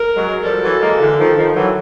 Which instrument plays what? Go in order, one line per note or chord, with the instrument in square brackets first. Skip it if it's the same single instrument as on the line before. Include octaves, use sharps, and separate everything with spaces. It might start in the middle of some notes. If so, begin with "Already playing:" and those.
Already playing: [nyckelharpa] A#4
[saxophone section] F#3 G#3
[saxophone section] F3 G3 [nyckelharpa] A4
[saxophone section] E3 F#3
G#3 A#3
D3 E3
D#3 F3
D#3 F3
E3 F#3